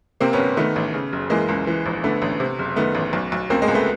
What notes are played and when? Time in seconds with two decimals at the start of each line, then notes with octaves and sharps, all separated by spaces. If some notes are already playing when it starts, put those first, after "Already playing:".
0.21 C3 A#3 C4
0.33 B3 C#4
0.39 G1
0.57 D#3 A3 B3
0.76 A1
0.94 C#3
1.13 F#1
1.30 E3 G#3 A#3
1.48 C#2
1.67 E3
1.86 A#1
2.04 D3 A3 B3
2.22 A1
2.40 C3
2.59 F#1
2.76 D#3 A3 B3
2.95 A1
3.13 B1
3.32 B1
3.50 C#2 A#3 C4
3.62 G#3 A#3
3.68 C#2
3.74 A3 B3